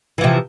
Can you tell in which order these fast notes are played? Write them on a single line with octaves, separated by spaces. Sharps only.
E3 F3 C3